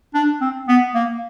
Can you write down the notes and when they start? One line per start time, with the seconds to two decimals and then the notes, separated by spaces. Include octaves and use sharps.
0.14 D4
0.41 C4
0.68 B3
0.95 A#3